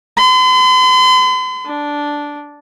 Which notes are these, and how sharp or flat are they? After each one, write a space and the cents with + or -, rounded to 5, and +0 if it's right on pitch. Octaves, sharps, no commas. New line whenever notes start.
C6 -45
D4 -5